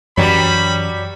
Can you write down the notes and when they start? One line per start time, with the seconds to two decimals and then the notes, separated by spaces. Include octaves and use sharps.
0.17 F#2 E3 F#3 G3 B5